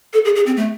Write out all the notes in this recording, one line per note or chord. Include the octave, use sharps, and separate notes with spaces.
A4
G#4
G#4
C4
A3